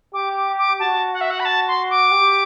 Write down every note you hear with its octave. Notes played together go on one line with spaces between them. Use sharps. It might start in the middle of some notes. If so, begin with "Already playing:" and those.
G4 D6
D6
D6
F#4 A5
F#5
E5
F#5
B5
A5
C6
D6
G4